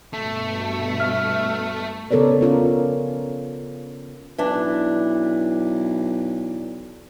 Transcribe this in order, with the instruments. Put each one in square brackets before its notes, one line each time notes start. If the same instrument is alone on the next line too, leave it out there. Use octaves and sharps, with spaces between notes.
[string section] G2 B2 [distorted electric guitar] A3
[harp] E5 F6
[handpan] C#3 B3 A4 A#4 C#5 D5
C#4 F4 A#4
[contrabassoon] B1 [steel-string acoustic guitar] E3 D4